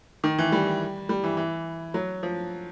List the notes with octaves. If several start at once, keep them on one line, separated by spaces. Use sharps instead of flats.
D#3
E3
G3
G3
E3
E3
F#3
F3